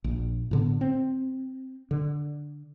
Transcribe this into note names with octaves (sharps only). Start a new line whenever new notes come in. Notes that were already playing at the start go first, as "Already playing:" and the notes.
A#1
A2 D3 B3
C4
D3